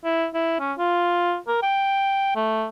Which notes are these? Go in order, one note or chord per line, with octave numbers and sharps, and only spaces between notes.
E4
E4
C#4
F4
A#4
G5
A3